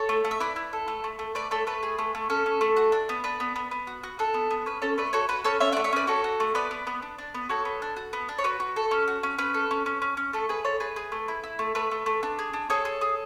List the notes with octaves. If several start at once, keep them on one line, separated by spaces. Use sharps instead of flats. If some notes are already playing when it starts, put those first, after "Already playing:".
Already playing: A4 C#5
A3
A3
E5
E4 B4 D5
E4
A4
A3
A3
A3
A3 B4 D5
A3 A4 C#5
A3 B4
G#4
A3
A3
C#4 A4
C#4
A3
F#4
D4
B3
D4 B4
B3
B3
B3
F#4
F#4
D4 A4
B3
B3
C#4 B4
C#4 A4 C#5
A3 B4 D5
F#4 A4 C#5
F#4 B4
C#4 A4 C#5
C#4 C#5 E5
D5 F#5
A3
C#5 E5
C#4 B4 D5
F#4 A4 C#5
F#4
A3
B3 B4 D5
B3
B3
D4
D4
B3
F#4 A4 C#5
B3
D4
F#4
B3
D4
C#5
F#4 B4
F#4
A4
C#4
F#4
C#4
C#4 B4
A4
C#4
C#4
C#4
C#4
A3 A4
G#4 B4
E4 A4 C#5
G#4 B4
G#4
A3
E4
E4
A3
A3 B4
A3
A3
D4
G#4
D4
G#4 A4 C#5
G#4
G#4